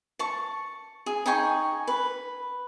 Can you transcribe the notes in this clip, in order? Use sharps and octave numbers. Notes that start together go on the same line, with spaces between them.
A5 C#6
G#4
D#4 G5 G#5 C#6
B4